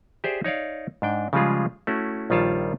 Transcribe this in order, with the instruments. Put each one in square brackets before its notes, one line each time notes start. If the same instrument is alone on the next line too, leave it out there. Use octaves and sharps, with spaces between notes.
[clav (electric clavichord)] G4 G#4 C5 D5 E5
D#4 C#5 D5 F5
G#2 D4 G5
C#3 F3 G3 G#3 F4 G#4
A3 C#4 E4 F#4
A#1 D#3 G3 F4 C#5 A5